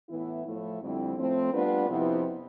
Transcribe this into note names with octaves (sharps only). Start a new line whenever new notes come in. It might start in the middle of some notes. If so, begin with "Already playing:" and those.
A2 E3 B3 E4
A2 F3 A3 E4
F2 D3 G3 C4 E4
A2 F3 A3 C4
G3 B3 D4 F4 B4
F2 C3 F3 B3 E4